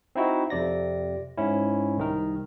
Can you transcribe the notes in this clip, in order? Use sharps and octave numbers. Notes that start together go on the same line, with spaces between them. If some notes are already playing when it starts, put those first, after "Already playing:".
C4 D#4 E4 F#4
F2 C3 D5 A#6
G#2 C#4 E4
C2 D#3 A#4